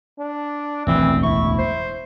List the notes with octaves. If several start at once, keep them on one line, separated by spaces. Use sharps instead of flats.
D4
E1 A1 D2 E3 C4
E4 C#6
C5